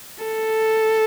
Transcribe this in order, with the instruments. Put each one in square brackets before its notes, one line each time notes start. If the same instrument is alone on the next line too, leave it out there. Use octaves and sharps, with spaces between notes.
[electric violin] A4